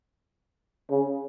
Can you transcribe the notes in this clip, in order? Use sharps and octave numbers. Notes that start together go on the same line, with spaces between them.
C#3